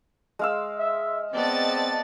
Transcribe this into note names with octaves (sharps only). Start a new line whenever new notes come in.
G#3 F5 E6
E5
B3 C4 D5 D#5 A5 A6